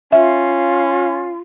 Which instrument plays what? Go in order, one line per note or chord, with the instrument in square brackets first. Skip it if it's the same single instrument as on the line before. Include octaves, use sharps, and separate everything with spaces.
[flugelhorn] C#4 [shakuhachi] F4 [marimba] E5